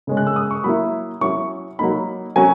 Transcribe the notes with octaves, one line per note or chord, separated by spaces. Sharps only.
C#3 G#3 C#4
F#6
E6
D#6
C#6
F#3 A#3 E4 B5
F#3 C#4 E4 C#6
F#3 A#3 D#4 B5
F#3 C#4 G#5